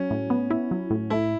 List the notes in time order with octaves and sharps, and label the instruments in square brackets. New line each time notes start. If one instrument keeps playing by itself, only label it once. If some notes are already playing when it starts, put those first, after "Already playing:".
Already playing: [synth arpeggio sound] F#3 [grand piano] C#4
[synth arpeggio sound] A2
B3
E4
F#3
A2
[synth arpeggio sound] A3 [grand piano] E4